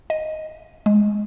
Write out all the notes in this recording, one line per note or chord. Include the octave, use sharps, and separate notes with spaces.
D#5
G#3